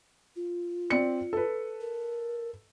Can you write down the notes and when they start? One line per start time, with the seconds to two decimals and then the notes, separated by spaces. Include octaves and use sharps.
0.36 F4
0.90 C4 D5 C#7
1.33 A4 B4
1.80 A#4